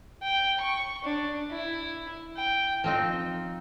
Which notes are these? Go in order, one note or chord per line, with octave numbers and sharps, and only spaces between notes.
G5
C#6
D4
E4
G5
F3 C4 D#4